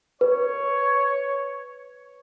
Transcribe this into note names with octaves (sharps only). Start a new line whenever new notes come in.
B4 C#5